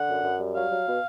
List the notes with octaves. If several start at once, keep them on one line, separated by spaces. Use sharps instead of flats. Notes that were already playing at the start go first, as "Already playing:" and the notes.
Already playing: D3 F#5
F#2
F#2
G3
F#3 F5
F#3
B2